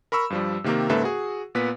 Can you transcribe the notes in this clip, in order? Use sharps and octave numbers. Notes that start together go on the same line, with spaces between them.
A#4 B5 C#6 E6
G2 F3 G3
C3 D#3 A#3 G4 A#4
G#2 C#3 A#3 A4 B4 E5
F#4 G#4
A#2 B3 B4 B6